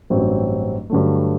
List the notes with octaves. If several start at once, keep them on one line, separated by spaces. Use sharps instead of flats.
A1 G2 F#3 C4
G2 D3 F#3 A3